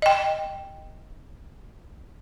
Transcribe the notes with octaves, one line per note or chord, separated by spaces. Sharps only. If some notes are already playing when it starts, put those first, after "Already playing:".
D#5 G5